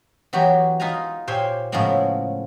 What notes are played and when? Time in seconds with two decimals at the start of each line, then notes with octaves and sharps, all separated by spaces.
0.33 E3 F#3 B3 F#4 G4
0.80 D#4 F4 B4 G#5 A#5
1.28 A#2 G4 C5 C#5 G#5
1.72 A2 C#3 F3 G#3 A#3 B3